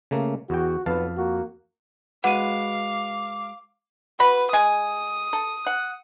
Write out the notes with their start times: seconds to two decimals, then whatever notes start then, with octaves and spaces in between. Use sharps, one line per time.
0.11 C#3 A3 A#3
0.50 E2 F#4 G5
0.86 B1 F2 B3 F5 A5
1.17 A#3 F#4
2.24 G#3 F#4 B4 F5 F#5 D6 D#7
4.20 F#4 B4 B5
4.53 G#3 G#5 D#6
5.33 A4
5.67 F#5